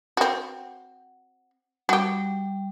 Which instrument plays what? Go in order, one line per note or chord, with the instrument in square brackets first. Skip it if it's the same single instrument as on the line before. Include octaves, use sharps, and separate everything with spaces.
[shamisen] C4 F#4
[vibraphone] G3 [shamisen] F#4 G4